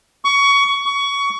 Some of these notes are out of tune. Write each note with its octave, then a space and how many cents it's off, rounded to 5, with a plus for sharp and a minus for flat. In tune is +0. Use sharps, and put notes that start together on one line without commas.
C#6 +20
C#6 +20